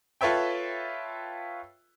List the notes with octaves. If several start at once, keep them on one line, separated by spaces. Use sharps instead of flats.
F4 A4 B4 C#5 E5 G5